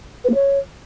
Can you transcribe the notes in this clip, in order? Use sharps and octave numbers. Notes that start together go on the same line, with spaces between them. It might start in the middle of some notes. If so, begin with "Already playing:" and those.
B4
A#3
C#5